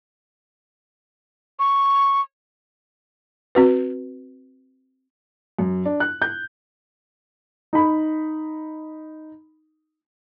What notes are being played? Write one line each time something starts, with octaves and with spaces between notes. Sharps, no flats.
C#6
C4 F#4 B4
F#2
D4
F#6
G6
D#4 B5